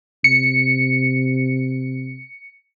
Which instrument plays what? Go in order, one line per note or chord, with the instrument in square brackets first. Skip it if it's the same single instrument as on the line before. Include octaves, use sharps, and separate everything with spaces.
[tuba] C3 [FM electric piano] C#7